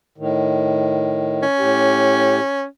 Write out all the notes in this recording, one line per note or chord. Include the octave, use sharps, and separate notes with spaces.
A2 D#3
C#4
A2 G4